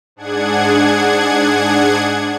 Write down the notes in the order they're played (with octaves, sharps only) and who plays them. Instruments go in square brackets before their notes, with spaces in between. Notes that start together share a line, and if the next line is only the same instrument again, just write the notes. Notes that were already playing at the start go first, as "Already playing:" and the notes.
[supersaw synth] G#2 D4 G#4 F#5 G#6